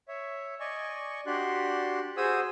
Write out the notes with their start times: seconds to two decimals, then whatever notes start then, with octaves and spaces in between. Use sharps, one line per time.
0.08 C#5 E5
0.60 D5 D#5 G#5 C#6
1.26 D4 F#4 G4 D5 C6 F#6
2.17 F#4 G#4 C5 G#5 D#6 E6